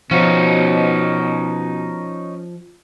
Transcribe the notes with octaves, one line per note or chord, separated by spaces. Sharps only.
B2 F3 C#4 D#4 F#4